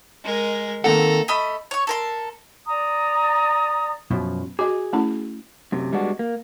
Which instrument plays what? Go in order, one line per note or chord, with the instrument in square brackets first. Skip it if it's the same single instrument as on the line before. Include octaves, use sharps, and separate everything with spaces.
[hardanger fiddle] G#3 A#4
[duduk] D#3 [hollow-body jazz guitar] A#3 C4 F#5 [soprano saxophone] A4 [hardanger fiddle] A#5
[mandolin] A3 D#5 B5
C#5 C#6
A4 A#4 C6
[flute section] D5 A#5 D#6
[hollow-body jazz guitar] F#2 B2 F3
[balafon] F#4 D#5 [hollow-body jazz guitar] G#4
[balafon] A3 C#4 E4
[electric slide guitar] F#2 C3
G3 G#3 B3 D4 F#4
A#3